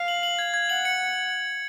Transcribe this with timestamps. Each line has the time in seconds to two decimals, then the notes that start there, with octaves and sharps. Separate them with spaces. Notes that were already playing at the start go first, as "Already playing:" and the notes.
Already playing: F5
0.08 F#7
0.23 F#7
0.39 G#6
0.54 G#6
0.69 F#5 F#7
0.85 C#7